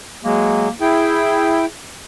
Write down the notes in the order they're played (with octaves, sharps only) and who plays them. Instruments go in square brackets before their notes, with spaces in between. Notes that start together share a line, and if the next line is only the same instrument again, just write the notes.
[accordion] F#3 G#3 [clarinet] A#3
[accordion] E4 G5 [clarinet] G#4